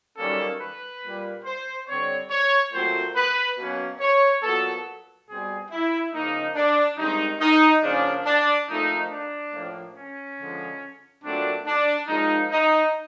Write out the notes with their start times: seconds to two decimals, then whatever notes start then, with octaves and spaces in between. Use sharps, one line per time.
0.17 F#2 D#3 G3 A#3 C#4 A4
0.60 B4
1.03 A#2 G3 A#3
1.45 C5
1.87 D3 G3 C4 C#5
2.30 C#5
2.73 A#2 F#3 A3 C4 C5
3.16 B4
3.57 B2 F#3 A#3 C#4
4.00 C#5
4.43 A#2 F#3 B3 A4
5.28 B2 G3 C4 G#4
5.71 E4
6.13 C#3 F3 A#3 D#4
6.55 D4
6.97 G2 D#3 G#3 C4 D#4
7.40 D#4
7.83 C#3 F3 A#3 C#4 D4
8.25 D4
8.68 A#2 F3 A3 C4 D#4
9.10 D4
9.53 A2 F3 A#3
9.95 C#4
10.38 D3 F3 G#3
11.23 A#2 F#3 A3 C4 D4
11.66 D4
12.08 A#2 F3 G#3 D#4
12.51 D#4